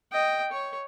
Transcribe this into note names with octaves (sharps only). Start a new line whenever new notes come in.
D#5 G5
C#5